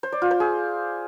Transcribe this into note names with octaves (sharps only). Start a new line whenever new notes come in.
C5
D5
F4
C5
G#4